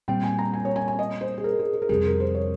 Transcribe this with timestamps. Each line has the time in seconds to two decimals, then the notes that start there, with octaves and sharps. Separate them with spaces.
0.08 A#2 G3 C4 G5
0.23 G#5
0.39 A#5
0.54 G#5
0.65 C#5
0.76 G#5
0.88 G#5
0.99 D#5
1.21 C5
1.38 G#4
1.44 A#4
1.59 G#4
1.74 G#4
1.82 A#4
1.89 F2 C3 G3 G#4
2.05 A#4
2.20 C5
2.35 C#5